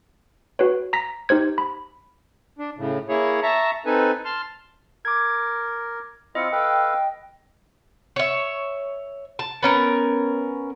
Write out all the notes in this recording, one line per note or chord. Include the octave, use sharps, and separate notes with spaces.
F#4 B4 C#5
A#5 A#6 B6
D#4 G4 C5 G#6
B5
D4
A2 C#3
A#3 E4 G#4 C#5
E5 A5 A#5 C#6
C4 D#4 A4 B4 G#5
A5 C6 F6
A#4 D6 G#6
C4 E4 F4 D#5 C#7
A4 B4 F5 G5
C#5 E5
A5
B3 C#4 A#4